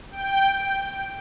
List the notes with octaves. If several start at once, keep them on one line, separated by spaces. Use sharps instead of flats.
G5